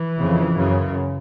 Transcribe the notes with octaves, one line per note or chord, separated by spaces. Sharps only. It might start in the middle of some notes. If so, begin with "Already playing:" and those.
Already playing: E3
F2 C#3
F#2 C#3